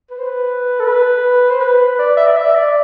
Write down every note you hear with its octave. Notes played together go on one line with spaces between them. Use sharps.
B4
C5
B4
A4
B4
C5
B4
D5
E5
D5
E5
D5